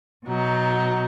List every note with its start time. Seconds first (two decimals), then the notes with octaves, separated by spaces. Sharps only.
0.25 B2 F#3 D#4